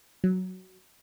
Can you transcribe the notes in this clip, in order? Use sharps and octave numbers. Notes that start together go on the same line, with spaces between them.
F#3